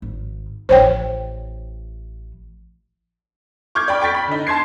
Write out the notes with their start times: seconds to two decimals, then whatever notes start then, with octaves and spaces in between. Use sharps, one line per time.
0.02 G#1
0.69 A1 E3 C5 C#5 G5
3.75 C#6 D6 F6 G6 G#6
3.88 D5 G5 B5 C#6
4.01 G5 C#6 A6 B6
4.15 B5
4.28 D3 D#4
4.47 A5 C6 G#6 C7